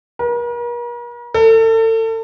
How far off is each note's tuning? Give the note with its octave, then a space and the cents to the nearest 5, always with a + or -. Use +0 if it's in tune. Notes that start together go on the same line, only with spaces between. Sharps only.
A#4 +45
A4 +35